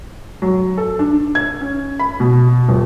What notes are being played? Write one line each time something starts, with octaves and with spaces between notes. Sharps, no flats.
F#3
A4
D4
G#6
C#4
B5
B2
D#1